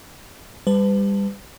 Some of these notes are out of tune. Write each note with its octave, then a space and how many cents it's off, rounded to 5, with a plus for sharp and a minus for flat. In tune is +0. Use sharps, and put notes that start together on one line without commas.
G3 +25 B4 +35 A5 +5